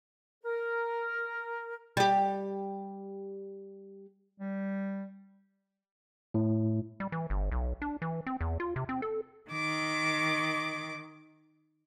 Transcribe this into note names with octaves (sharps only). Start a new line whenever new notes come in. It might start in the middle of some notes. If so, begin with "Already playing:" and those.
A#4
G3 G4
G3
A2
G3
E3
G1
B1
D4
E3
C4
E2
F4
C3
C4
A4
D#3 D6